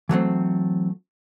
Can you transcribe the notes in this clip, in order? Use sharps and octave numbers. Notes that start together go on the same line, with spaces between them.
E3 F#3 A3 C4